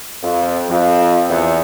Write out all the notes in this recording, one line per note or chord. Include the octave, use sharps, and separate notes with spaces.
F2
F2
E2